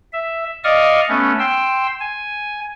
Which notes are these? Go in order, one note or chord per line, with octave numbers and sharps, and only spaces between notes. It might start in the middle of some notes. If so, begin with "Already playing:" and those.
E5
D5 D#5 F5 C#6 D#6 F6
A3 B3 C#4
G5 C6 E6
G#5